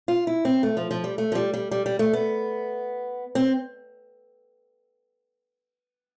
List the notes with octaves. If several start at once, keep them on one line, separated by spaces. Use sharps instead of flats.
F4
E4
C4
A3
F3
F3
G3
A3
F3
G3
G3
G3
G3
A3
B3
C4